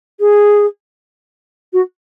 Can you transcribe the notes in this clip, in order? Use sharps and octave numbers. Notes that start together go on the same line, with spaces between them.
G#4
F#4